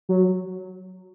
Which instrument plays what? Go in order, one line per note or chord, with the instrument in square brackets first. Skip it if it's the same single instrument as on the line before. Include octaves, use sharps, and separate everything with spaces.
[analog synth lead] F#3